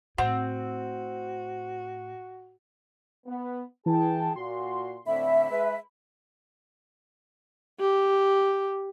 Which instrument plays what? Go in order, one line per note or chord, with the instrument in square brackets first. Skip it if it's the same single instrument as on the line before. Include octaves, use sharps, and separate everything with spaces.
[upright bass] A2 [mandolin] C4 [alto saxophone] F#4 [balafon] F#5
[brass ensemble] B3
[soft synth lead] E3 [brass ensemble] G#4 G5 A5
[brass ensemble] A#2 F#4 [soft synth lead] C6
[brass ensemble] A2 D3 C4 [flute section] E5 [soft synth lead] B5
[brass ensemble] G#3 B4
[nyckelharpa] G4